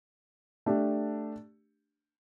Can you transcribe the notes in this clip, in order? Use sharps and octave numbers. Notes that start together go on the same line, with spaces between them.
A3 D4 G4